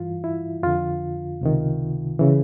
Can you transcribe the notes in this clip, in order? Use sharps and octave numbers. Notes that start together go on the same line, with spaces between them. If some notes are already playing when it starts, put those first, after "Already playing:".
Already playing: G2 E3 F4
E4
F2 D3 F4
C#2 C3 D#3
C#3 E3